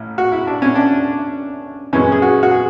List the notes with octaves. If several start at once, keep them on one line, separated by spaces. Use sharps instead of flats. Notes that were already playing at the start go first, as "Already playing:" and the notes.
Already playing: A1 A2
F#4
E4
D4
C#4
D4
F#2 E3 G#3 C#4
G#4
F#4
F#4
G#4